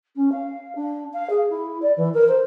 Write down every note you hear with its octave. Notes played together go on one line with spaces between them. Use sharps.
C#4
F5
D4
F5
G#4
E4
D5
E3
A#4
C5